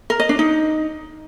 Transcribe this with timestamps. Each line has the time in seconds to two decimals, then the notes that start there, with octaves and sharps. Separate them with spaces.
0.10 A#4
0.20 D#5
0.29 D4
0.39 D#4